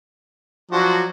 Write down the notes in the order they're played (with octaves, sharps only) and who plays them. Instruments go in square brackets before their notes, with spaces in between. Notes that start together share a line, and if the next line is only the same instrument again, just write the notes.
[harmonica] F3 F#3 [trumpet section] D4 F#4